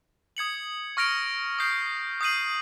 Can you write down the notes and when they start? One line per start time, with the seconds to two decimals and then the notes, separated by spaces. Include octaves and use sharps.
0.37 D#6 G#6 C#7 F#7
0.97 C#6 F6 A#6 D7 F7
1.59 D#6 G6 C7
2.21 D#6 G6 C7 D#7 F#7